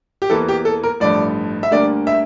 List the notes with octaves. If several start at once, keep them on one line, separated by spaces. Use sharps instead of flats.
G4
E2 E3 A#3 A4
G4
A4
A#4
A1 G2 F3 A3 D5
E5
D2 D3 G3 A#3 D5
E5